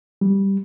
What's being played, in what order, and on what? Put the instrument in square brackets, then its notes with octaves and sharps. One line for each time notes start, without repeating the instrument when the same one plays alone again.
[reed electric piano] G3